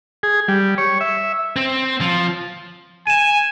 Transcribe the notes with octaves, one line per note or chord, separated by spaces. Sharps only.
G#4
G3
C#5
E5
C4
F3
G#5 D#7 E7